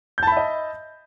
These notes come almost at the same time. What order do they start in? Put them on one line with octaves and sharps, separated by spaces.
G6 A5 B5 E5 D#5